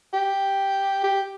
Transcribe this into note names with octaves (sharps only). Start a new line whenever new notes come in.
G4
G4